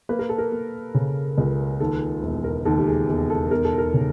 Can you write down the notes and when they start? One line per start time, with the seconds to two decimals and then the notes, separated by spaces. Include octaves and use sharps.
0.09 A#3 B4
0.19 A#4
0.29 A4
0.38 A#4
0.52 A#3
0.94 C#3
1.37 C#2
1.80 D#2 A4
2.23 E1
2.44 A#4
2.65 D#2 A4
2.78 G4
2.87 G#4
3.08 E1 G#4
3.30 A4
3.51 E1 A#4
3.65 A4
3.78 A#4
3.94 C#3